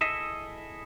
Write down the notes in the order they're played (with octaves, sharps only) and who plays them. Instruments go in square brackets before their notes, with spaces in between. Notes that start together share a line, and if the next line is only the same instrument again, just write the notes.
[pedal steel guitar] E4 G#4 A4 D#5 E5